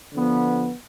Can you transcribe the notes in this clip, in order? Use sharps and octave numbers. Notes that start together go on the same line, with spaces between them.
D3 F3 B3